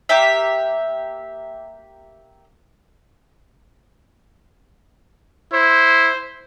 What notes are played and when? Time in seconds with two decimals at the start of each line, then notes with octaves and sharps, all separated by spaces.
0.09 A#3 G4 E5
5.53 E4 C5